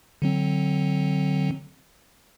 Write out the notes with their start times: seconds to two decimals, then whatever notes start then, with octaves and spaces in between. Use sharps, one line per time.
0.22 D3 F#3 C4